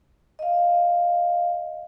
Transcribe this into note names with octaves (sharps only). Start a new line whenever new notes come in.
D#5 F5